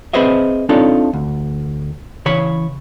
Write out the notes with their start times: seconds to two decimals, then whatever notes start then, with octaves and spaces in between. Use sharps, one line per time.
0.13 C4 G#4 B4 C5 D#5 E5
0.69 C4 D4 D#4 F4 A4 C#5
1.13 D2
2.26 C#3 E3 C#5 B5